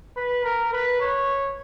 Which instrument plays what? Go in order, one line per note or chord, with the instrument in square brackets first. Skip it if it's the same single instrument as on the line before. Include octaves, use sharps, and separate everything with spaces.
[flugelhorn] B4
A#4
B4
C#5